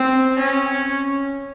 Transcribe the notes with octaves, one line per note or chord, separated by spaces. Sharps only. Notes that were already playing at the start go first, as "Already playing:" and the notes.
Already playing: C4
C#4